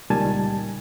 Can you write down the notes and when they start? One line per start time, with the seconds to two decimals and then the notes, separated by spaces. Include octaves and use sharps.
0.10 C#2 A#2 D#3 G3 G#5 A5